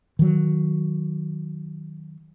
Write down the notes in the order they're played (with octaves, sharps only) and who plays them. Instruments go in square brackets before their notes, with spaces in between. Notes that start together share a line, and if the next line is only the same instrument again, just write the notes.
[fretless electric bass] D#3 F#3